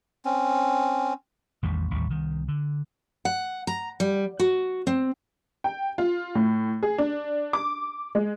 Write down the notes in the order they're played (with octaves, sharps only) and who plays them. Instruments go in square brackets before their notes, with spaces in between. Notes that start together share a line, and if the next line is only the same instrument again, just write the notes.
[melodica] C4 C#4
[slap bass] A1 E2 D#3 G3
A1 D#2 G3
C2 D#3
D3
[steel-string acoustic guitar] F#5
A#5
G3
F#4
C4
[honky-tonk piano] G5
F4
A2
G#4
D4
D6
G#3